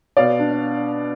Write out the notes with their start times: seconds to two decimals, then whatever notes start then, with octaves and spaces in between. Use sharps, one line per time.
0.17 B2 D5 F5
0.39 D4